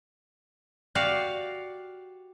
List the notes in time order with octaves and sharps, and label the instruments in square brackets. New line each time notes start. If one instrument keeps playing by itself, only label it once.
[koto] F#4 G4 D5 F5